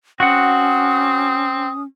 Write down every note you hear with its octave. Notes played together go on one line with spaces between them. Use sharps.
C4 C#4 F#4 F#5 D#6